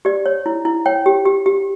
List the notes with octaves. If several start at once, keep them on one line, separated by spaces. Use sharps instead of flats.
G4 D5
C#5
E4
E4
C#5 G5
G4
G4
G4